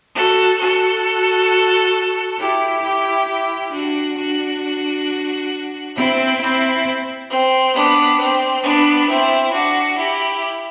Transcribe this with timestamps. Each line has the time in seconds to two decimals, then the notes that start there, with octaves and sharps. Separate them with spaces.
0.15 F#4 A4
0.60 F#4 A4
2.38 E4 G4
2.83 E4 G4
3.27 E4 G4
3.73 D4 F#4
4.17 D4 F#4
5.96 C4 E4
6.40 C4 E4
7.30 C4
7.75 B3 D4
8.19 C4
8.64 B3 D4
9.09 C4 E4
9.53 D4 F#4
9.98 E4 G4